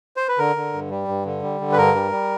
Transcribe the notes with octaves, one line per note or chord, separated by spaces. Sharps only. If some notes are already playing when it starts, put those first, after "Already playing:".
C5
B4
D3 A#4
D3
G2
G3
G2
D3
G3
D3
B4
G2 A#4
G3
G3